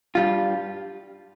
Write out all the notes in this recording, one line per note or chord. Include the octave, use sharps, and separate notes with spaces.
G2 G3 F4